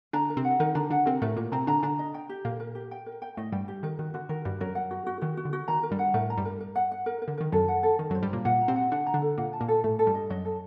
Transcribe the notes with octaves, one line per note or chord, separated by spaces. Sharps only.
D3 D4 A#5
A#4
C3 C4
F#5
D#3 D#4 A#4
D3 D4 A#5
D3 D4 F#5
C3 C4 A#4
A2 A3 A#4
A#2 A#3 A#4
C3 C4 A#5
D3 D4 A#5
D3 D4 A#5
D#5
G5
G4
A#2 A#3 A#4
A#4
G4
G5
A#4
G5
A2 A3 D#5
G2 G3 G5
G4
D#3 A#4
D#3 F#4
D3 F#4
D#3 A#4
G2 G3 F#4
F#2 F#3 A#4
F#5
F#4
F#4
D#3 F#4
F#4
D3
F#4
D#3 A#5
A#4
G2 G3
F#5
A2 A3 A#4
A#5
G2 G3
A#4
A#4
F#5
F#5
A#4
A#4
D3
D#3 A#4
F#2 F#3 A4
F#5
A4
D#3 A4
F#2 F#3 C5
G2 G3
A#2 A#3 A#5
A#2 A#3 F#5
A#5
C3 C4
F#5
D3 D4 F#5
A#5
D3 D4
A4
A#2 A#3 F#5
A5
A#2 A#3
A4
A2 A3 A4
A4
G2 G3
D#5
F#2 F#3 D#5
A4